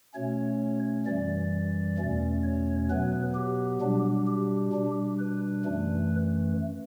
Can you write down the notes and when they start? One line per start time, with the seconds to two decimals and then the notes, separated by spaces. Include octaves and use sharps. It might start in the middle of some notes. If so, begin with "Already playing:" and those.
0.14 B2 A3 C#4 C#5
1.06 F#2 E3 G3 D5
1.98 E2 B2 A3 C#4
2.43 C#5
2.90 B2 F#3 B3 B4
3.35 G4
3.81 B2 G3 D4
4.27 G4
4.73 B2 G3 D4
5.19 B4
5.65 F#2 E3 A3